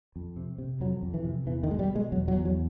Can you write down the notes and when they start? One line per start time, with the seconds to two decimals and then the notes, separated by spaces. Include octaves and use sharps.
0.16 F2
0.37 C3
0.58 C3
0.80 F2 F#3
1.03 F2
1.14 E3
1.25 C3
1.46 E2 E3
1.63 D#3
1.68 B2 G#3
1.79 G3
1.91 B2 G#3
2.12 E2 F#3
2.28 F#3
2.35 E2
2.45 F#3